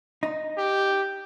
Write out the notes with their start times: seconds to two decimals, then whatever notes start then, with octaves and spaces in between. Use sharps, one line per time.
0.23 D#4
0.57 G4